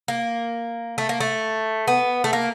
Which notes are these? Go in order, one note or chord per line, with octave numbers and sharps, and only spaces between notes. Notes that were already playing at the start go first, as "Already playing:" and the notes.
A#3
A3
A#3
A3
B3
A3
A#3